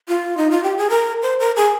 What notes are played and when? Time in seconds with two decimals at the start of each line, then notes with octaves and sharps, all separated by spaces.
0.08 F4
0.37 D#4
0.51 F4
0.63 G4
0.78 G#4
0.90 A#4
1.23 C5
1.40 A#4
1.56 G#4